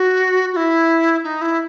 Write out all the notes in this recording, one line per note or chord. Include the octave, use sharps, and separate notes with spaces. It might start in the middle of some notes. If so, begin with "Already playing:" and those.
Already playing: F#4
F#4
E4
D#4
E4